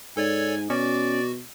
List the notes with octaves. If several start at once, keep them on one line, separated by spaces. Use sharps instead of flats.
G#2 A4 C#5 D5 G#5
B2 C#4 F#4 D5